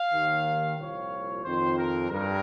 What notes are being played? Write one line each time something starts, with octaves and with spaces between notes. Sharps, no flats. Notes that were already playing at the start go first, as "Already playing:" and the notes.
Already playing: F5
D#2 D#3
C2 A#2 F3 C#5
F2 D#3 C5
A#4
G2 A#4